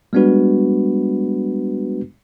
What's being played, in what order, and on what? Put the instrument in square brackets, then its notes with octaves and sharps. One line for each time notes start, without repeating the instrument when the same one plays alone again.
[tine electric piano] G3 G#3 B3 D4 F#4 B4